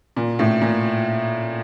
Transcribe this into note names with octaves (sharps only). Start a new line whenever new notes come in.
A#2
A2
A#2